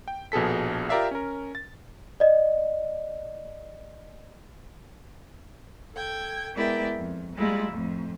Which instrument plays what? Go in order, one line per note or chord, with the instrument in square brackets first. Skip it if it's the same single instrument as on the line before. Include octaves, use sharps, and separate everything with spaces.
[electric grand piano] G5
A#1 B2 G#4 A4 B6
F4 G4 A#4 D5 E5 F5
C#4 A#4
A6
[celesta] D5 D#5
[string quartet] A4 G5 G#6
G#3 B3 E4 A#4 D5 G5
F2
G3 G#3 A#3 E4 F4 D5
F2 A2